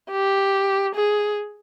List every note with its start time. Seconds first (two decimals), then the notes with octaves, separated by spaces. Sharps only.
0.11 G4
0.95 G#4